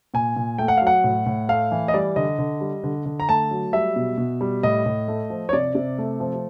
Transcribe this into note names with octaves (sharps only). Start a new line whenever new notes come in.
A#2 G#5
A#2
A3 G5
F#5
F#3 F5
F#5
A2
A2
A3 F5
E3
D#5
G3 D5
D3 D#5
D3
G3
D3
D3
A#5
A3 A5
F#3
G3 E5
B2
B2
G3
A2 D#5
A2
A3
F3
C#5
C3 D5
C3
A3
F3